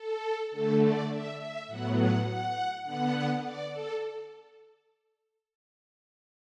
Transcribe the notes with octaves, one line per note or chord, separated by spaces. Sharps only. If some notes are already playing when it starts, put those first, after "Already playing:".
Already playing: A4
D3 A3 A4
D5
E5
E5
A2 F#3 B3 F#5
F#5
F#5
D3 B3 F#5
D5
A4